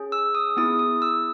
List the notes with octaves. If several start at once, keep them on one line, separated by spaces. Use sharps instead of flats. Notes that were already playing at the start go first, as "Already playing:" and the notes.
Already playing: C#4 G#4
E6
D#6
B3 E4 G#4 D#6
D#6
E6